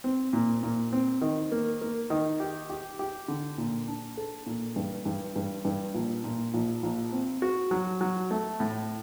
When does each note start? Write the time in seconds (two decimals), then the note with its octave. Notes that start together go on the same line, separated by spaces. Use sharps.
0.04 C4
0.33 A#2
0.63 A#2
0.93 C4
1.22 D#3
1.52 A#3
1.81 A#3
2.10 D#3
2.40 G4
2.70 G4
2.99 G4
3.28 D3
3.58 A#2
3.88 D4
4.17 A4
4.46 A#2
4.76 G2
5.05 G2
5.36 G2
5.65 G2
5.94 A#1
6.24 A#2
6.54 A#1
6.83 A#1
7.12 C4
7.42 F#4
7.71 F#3
8.01 F#3
8.31 A3
8.60 A2